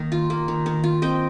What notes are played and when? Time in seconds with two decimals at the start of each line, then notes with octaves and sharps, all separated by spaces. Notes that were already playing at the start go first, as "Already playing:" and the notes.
Already playing: D#3 A#3
0.12 F4
0.30 A#3
0.48 D#3
0.66 D#3
0.84 F4
1.02 C4 D#5 G5